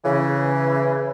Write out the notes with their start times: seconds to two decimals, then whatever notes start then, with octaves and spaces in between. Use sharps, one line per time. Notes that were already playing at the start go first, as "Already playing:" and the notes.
0.05 C#3 E3